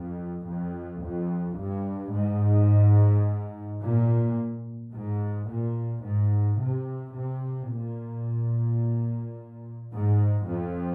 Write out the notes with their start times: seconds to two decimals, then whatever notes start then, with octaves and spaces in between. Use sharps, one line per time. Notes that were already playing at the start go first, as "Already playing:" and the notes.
Already playing: F2
0.48 F2
1.04 F2
1.59 G2
2.15 G#2
3.82 A#2
4.94 G#2
5.49 A#2
6.04 G#2
6.60 C3
7.15 C3
7.71 A#2
9.94 G#2
10.50 F2